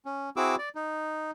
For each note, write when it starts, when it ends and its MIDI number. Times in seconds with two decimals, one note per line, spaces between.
0.05 0.30 61
0.36 0.56 60
0.36 0.56 64
0.36 0.56 66
0.36 0.56 68
0.36 0.56 86
0.36 0.56 88
0.59 0.69 74
0.75 1.31 63